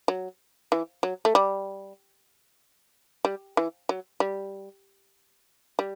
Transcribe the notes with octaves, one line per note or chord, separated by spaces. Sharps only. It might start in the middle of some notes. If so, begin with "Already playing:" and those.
F#3
E3
F#3
A3
G3
G3
E3
F#3
G3
G3